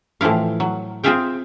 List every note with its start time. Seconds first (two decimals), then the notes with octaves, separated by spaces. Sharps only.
0.21 A2 E3 F3 E4 F5
0.60 F#3
1.03 C4 F4 G#4 E5 F5 G5